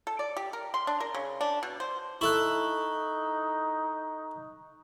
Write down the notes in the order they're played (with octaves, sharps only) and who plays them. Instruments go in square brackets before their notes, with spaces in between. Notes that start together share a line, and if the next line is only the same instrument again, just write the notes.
[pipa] A4
D5
G4
A#4
C6
D4
A#4
C#3
D4
B2
C5
[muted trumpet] D#4 [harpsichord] E4 A4 [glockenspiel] C#6 F#6